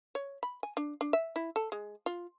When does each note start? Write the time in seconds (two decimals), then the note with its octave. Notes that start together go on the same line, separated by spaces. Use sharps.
0.15 C#5
0.43 B5
0.63 G#5
0.77 D4
1.01 D4
1.13 E5
1.36 E4
1.56 A4
1.72 G#3
2.06 F4